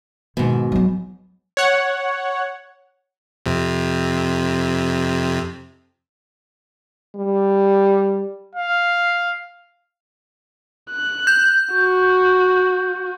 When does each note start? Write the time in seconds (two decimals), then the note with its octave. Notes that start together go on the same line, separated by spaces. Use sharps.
0.37 G#2 B2 D#3 D#4
0.72 F#3 B3
1.57 C#5 F#5
3.46 F2 C3
7.15 G3
8.55 F5
10.91 F#6
11.27 G6
11.74 F#4